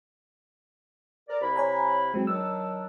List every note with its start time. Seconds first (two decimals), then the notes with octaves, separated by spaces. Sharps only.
1.28 A#4 D5
1.41 C3 E4 B5
1.56 C#5 G#5 A#5
2.14 F#3 G#3 C4
2.27 D#3 F#3 D4 E6